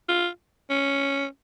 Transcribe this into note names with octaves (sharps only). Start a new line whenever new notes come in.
F4
C#4